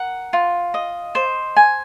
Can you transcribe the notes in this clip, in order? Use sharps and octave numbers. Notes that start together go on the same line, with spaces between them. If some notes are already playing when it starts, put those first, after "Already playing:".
Already playing: A#4 F#5
F4
D#5
C5
G#5